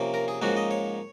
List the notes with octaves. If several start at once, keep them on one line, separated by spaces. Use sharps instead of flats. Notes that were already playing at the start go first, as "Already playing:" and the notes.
Already playing: C3 F3 A#3 C#4
A#4
G#4
G#2 F3 A#3 C#4 F#4
D#5
C#5